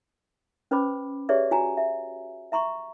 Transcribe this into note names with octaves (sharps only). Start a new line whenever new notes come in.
C#4 B4 C5 B5 D6
G4 G#4 B4 C#5 D5 E5
F#4 G#5 A#5
E5
E5 A#5 C6 C#6